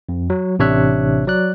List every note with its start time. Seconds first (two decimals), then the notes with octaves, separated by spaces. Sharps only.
0.09 F2
0.30 F#3
0.59 A1 C3 D4 C#5 E5 F#6
1.27 F#3 D5 F#6